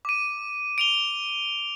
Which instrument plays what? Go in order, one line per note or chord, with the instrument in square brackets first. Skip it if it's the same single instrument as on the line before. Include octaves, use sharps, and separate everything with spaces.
[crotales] D6 D#7
D7 F7 G7